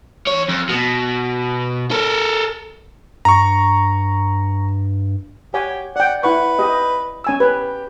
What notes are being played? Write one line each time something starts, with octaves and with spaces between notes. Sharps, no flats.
E2 C#5
F2
B2
A4 A#4
G2 A#5 C#6
G4 C#5 F#5 G#5
D5 F#5 G5
E4 B4 F#5 C#6
G4 D#5
C#4 G#5 E6
G4 B4